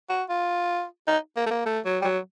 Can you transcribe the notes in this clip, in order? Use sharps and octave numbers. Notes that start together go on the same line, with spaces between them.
F#4
F4
D#4
A#3
A3
A#3
A3
F#3
G3
F#3